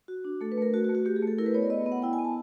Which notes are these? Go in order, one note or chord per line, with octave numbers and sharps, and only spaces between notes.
F#4
D4
A3 A4
B4
A3 A#4
A3 F#4
F#4
A3
F#4
A3 G4
G#4
A3 A4
E4 A#4
B4
B3 C#5
D5
B3 D#5
B3
F#5
E4 G5
G#5
B3
A5